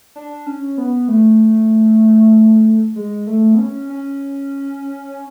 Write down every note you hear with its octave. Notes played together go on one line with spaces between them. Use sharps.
D4
C#4
B3
A3
G#3
A3
B3
C#4
C#4